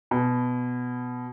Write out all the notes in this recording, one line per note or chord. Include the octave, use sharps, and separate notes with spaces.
B2